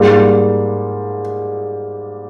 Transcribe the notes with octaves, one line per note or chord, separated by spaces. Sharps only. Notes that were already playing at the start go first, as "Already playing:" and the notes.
Already playing: G#2 G3 A#3 F4 G#4